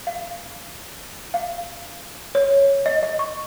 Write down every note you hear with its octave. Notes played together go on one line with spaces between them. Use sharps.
F5
F5
C#5
D#5
D#5
C#6